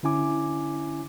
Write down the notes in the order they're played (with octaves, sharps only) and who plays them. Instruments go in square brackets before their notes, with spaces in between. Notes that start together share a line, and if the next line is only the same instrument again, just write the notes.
[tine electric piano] D3 C#4 E4 G#5 D6